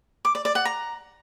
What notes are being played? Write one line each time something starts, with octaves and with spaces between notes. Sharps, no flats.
D6
D5
D5
F#5
A#5